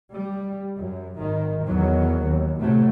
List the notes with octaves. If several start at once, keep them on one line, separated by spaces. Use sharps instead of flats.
G3
F#2
G#1 D#3
E2 D#3 F#3
D#2
A2 C3 F#3 A3